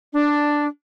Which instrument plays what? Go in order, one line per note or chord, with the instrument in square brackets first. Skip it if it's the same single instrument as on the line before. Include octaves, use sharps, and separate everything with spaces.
[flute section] D4